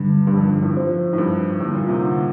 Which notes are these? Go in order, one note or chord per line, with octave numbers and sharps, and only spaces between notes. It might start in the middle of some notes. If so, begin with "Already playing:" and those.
Already playing: D2 G2 D3 G3
G2
F2
G2
A2
F3 C4 F4 C5
A2
G2
F2 A2 D3 G3 A#3
A#2
C3
D3